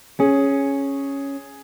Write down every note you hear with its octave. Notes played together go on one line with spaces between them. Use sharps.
C#4 G#4